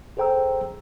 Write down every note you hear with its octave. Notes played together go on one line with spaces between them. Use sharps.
G#4 A4 C5 G5 A#5 E6